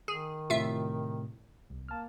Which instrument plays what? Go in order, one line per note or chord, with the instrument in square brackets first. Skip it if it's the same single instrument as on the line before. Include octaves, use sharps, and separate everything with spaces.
[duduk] D#3 [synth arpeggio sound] G#4
[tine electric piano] A2 C3 [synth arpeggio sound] F4 E5
[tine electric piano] C2
[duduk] A#3 [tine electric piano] A5 F6